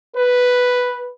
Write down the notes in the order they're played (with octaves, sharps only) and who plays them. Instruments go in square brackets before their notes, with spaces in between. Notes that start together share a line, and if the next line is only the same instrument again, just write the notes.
[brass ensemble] B4